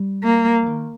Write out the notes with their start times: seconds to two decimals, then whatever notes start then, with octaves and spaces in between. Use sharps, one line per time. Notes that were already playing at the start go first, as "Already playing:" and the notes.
Already playing: G3
0.23 A#3
0.62 F3
0.66 D#3